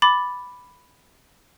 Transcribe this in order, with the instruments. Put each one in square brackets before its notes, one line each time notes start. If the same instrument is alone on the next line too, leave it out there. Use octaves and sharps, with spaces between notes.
[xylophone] B5 D6 A6